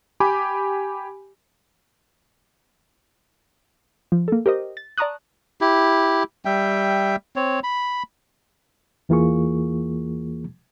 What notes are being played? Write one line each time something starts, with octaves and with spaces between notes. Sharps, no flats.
G4 G#5 B5 D6
F3
A#3 A4
G4 A#4 C5 D#5
A6
D5 A5 A#5 C#6 D#6 F#6
E4 G4
G3 E5 G5
C4 C#5
B5
E2 E3 A#3 F4 G#4 C#6